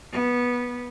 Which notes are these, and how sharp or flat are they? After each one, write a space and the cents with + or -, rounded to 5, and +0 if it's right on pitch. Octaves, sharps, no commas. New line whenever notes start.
B3 -15